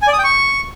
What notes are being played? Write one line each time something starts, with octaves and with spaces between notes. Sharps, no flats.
G#5
D5
D#6
G5
C#6